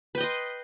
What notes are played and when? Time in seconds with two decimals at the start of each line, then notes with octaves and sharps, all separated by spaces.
0.15 B4
0.18 G5
0.21 D#5
0.23 C6